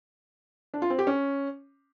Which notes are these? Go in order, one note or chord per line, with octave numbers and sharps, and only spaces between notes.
D4
F4
C4
G4
C#4